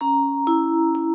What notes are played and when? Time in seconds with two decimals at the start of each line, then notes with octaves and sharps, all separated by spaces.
0.01 C#4 A#5
0.47 E4
0.95 E4